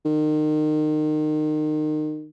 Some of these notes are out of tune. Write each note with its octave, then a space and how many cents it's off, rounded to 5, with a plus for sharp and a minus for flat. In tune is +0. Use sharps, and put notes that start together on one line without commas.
D#3 -25